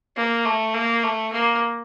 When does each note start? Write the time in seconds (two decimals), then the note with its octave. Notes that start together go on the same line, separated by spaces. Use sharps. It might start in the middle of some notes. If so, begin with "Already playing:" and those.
0.17 A#3
0.46 A3
0.74 A#3
1.03 A3
1.32 A#3